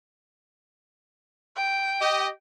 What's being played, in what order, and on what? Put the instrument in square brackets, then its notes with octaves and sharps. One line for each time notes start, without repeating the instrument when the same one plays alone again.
[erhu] G5
[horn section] G4 D#5